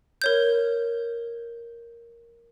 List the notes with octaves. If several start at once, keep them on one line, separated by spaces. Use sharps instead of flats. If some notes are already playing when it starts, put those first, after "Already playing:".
A#4 C#5 G6